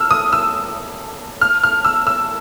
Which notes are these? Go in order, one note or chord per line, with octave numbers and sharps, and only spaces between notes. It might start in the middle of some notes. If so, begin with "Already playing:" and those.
Already playing: E6 F6
D#6
E6
F6
F6
E6
E6